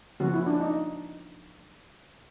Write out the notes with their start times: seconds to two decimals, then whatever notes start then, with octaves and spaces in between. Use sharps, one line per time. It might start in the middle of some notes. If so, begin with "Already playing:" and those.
0.20 C#3 F3 A#3 C#4 F#4
0.34 E4
0.46 D4
0.60 D#4